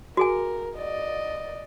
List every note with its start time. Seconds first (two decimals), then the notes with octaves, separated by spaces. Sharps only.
0.17 F#4 G#4 A#4 G#5
0.77 D5 D#5